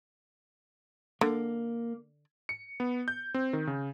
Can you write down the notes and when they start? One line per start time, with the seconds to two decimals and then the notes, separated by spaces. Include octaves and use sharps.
1.21 D3 A#3
2.49 C#7
2.80 B3
3.08 G6
3.34 C4
3.53 D#3
3.67 C#3